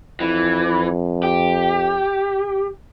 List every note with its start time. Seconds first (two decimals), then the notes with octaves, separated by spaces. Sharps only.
0.20 F2 E3
1.23 G4